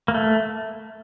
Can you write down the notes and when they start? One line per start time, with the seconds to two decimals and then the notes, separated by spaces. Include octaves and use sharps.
0.08 A#3
0.14 A3